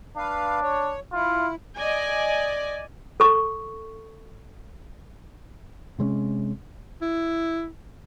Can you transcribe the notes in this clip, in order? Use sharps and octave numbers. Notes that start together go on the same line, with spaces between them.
D4 B4 F5
C#5
E4 F4
D5 D#5 G#5
A4 C#6
C3 G#3 C4 C#4
E4